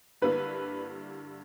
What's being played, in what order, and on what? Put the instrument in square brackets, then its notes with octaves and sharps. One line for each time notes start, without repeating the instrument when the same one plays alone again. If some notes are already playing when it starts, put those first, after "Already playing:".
[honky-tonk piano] G2 D3 G3 A#3 E4 [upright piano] B4